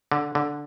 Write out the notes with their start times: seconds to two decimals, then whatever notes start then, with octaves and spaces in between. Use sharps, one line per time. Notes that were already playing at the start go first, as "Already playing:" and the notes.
0.12 D3
0.35 D3